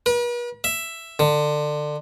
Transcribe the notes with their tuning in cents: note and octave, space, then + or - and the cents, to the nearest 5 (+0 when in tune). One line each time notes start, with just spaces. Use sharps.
B4 -45
E5 +5
D3 +25